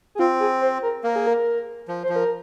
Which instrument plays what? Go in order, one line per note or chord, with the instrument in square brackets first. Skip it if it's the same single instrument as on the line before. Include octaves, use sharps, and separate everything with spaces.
[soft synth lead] G#4
[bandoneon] C4 [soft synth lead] F4
[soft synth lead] G#4
C5
A#4
[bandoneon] A#3 [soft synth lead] A#4
[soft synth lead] G#4
A#4
[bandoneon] F3
[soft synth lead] C5
[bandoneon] F3
[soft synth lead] A#4